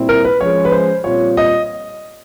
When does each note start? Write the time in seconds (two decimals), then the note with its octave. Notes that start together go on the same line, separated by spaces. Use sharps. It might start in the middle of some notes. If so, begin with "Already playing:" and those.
Already playing: A#2 G3 C4 E4
0.09 A#4
0.24 B4
0.40 F3 G#3 C#4 C#5
0.65 B4
0.72 C5
1.04 A#2 G3 C4 F4 C#5
1.37 D#5